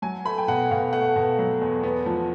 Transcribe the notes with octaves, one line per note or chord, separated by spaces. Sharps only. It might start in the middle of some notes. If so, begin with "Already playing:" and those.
F#3 G#5
A3 B5
G5
B2 F#5
B2 F5
A3 F#5
B2
F#3
E2
B3
F3